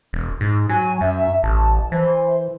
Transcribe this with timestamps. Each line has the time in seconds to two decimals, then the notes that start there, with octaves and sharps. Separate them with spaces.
0.13 E1
0.41 G#2
0.69 F#3 G#5
1.01 F#2 E5
1.43 A1 A5
1.92 E3 C5